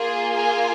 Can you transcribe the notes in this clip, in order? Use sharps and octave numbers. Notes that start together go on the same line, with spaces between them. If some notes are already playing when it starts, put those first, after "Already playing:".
Already playing: A#3 F4 G#4
G#4 G#5